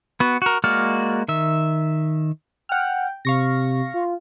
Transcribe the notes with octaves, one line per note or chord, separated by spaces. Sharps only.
B3 F#4
F#4 A#4
G#3 A#3 F#4 D5 F6
D#3 E5
F#5 G5 F6
C3 F5 C#6 A#6
F4